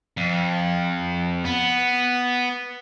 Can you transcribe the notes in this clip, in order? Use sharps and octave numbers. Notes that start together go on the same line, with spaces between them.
F2
B3